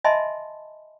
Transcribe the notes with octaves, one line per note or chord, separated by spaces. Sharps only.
D#5 E5 G#5 A5 B5 C6